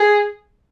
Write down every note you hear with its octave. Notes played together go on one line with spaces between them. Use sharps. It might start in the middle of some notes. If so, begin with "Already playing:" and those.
Already playing: G#4